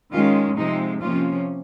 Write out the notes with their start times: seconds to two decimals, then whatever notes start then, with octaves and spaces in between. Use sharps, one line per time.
0.13 D#3 G#3 C#4 F4
0.57 C3 F3 G#3 C4 D#4
1.01 C3 F3 A#3 C#4 F4